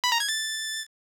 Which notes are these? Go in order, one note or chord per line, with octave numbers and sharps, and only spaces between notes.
B5
A#5
G#6
A6